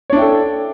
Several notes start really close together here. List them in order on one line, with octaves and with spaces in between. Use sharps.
C#5 D4 E4 G5 A4